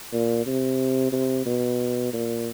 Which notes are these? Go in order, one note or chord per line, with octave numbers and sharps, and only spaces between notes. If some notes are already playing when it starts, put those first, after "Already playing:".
A#2
C3
C3
B2
A#2